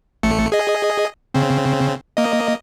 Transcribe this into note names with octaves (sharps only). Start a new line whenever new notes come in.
A1 A3 C#7
G#4 D#5
C#3 C4
A#3 D#5